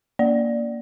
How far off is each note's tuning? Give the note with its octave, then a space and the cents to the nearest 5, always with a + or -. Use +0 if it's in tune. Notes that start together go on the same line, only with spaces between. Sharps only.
A#3 +5 D5 +0